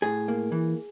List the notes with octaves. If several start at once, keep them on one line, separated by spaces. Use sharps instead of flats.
A2 G#4
A#3
E3